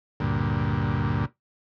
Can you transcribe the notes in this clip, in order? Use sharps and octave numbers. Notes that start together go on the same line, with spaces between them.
D2 G2 A#2